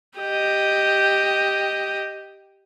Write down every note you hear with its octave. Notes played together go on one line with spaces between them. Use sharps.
G4 D#5